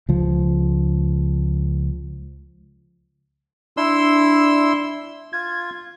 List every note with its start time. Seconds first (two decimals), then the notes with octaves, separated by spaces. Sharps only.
0.09 C#2 F3
3.77 D4 E4 C6 E6
5.33 F4 G#6